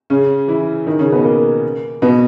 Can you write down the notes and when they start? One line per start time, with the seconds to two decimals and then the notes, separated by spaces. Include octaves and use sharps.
0.10 C#3 C#4
0.48 E3 E4
0.87 D#3 D#4
0.99 C#3 C#4
1.12 B2 B3
1.25 A#3
2.02 B2 B3